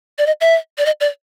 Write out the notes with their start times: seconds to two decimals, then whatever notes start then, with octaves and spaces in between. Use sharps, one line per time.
0.18 D5
0.27 D#5
0.41 E5
0.78 D5
0.86 D#5
1.01 D5